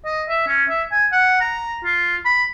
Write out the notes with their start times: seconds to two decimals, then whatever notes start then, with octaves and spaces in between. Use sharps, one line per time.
0.05 D#5
0.29 E5
0.47 C#4
0.69 E5
0.92 G#5
1.12 F#5
1.41 A#5
1.84 F4
2.25 B5